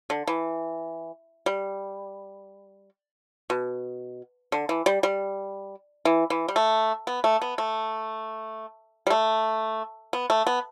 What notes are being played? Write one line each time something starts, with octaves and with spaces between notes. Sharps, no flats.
D3
E3
G3
B2
D3
E3
G3
G3
E3
E3
G3
A3
B3
A3
B3
A3
G3
A3
B3
A3
B3